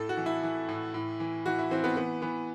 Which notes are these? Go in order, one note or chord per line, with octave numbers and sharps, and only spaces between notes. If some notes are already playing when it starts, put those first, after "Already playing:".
Already playing: A2 A4
F#4
E3
E4
E3
A2
A2
E3
E3 F#4
E4
E3 C4
B3
E3 B3
E3 B3